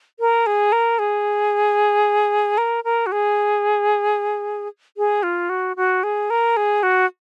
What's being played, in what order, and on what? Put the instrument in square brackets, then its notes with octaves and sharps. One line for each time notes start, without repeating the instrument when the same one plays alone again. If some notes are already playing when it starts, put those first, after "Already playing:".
[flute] A#4
G#4
A#4
G#4
A#4
A#4
F#4
G#4
G#4
F4
F#4
F#4
G#4
A#4
G#4
F#4